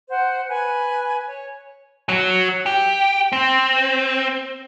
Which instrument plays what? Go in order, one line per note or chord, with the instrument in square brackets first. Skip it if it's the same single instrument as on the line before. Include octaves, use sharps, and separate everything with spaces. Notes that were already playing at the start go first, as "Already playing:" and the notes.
[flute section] C5 F#5
B4 G#5
C#5
[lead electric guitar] F#3
G4
C4